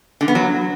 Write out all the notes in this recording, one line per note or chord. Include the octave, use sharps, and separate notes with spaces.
D3
B3
F#3